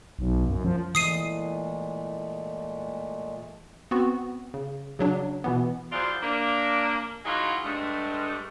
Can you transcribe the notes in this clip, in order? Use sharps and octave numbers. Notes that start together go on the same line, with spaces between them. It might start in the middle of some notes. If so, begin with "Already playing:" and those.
B1
F#2
F3
A#2 E3 G#3 A3 D#6 C7 D#7
B3 C4 F#4
C#3
C#3 F#3 D4
B2 E3 B3
E3 F#3 F4 G#4 C5 D5
A#3 D4
E3 F#3 D#4 F4 F#4 G#4
G2 G#3 A3